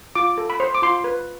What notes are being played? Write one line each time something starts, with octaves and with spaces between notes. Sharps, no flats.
F4 D6
A4
B5
C5
D6
F4 C6
B4